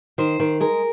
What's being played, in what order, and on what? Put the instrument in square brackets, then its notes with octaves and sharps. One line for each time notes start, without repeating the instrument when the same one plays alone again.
[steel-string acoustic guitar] D#3 C5
D#3
G#3 A#4